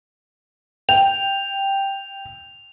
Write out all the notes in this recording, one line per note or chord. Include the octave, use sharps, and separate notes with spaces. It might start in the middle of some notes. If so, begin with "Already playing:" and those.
G5 F7